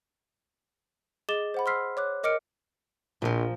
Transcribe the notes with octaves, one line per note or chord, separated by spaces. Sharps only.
G#4 D#5 D6 A6 E7 G7
C5 F#5 B5
C6 E6 F6 B6 C7
C#5 D6 F#6
A#4 D#5 D6 F6 C#7 D7
A#1 A#2 F3